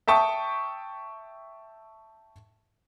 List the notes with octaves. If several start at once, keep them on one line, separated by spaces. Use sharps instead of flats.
E5 G5 A5 C#6 D#6